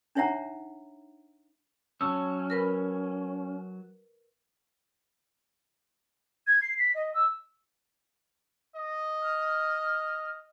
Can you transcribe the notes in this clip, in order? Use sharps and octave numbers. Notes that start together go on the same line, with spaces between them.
D4 D#4 C#5 E5 F#5 A#5
F#3 C#4 A5 E6
A#4 B4 B5
G#6
C7
B6
D#5
E6
D#5
F6